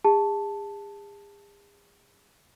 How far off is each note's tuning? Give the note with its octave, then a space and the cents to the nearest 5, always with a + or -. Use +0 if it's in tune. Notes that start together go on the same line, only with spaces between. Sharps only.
G#4 -40 A5 +0